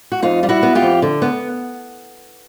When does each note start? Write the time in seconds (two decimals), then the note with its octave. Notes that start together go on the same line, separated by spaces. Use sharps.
0.12 F#4
0.22 F2 D#4 F4
0.43 G3 F4
0.49 E4 F#4
0.63 B3
0.75 F4 G4
0.82 F2
1.02 D3
1.22 B3